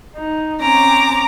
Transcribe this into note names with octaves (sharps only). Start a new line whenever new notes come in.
D#4
C4 C#4 A#5 D6